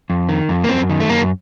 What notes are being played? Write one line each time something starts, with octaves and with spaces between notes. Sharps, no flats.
F2
D#3
F2
A#3
F#2 C4
D#3
A3
F#2 A#3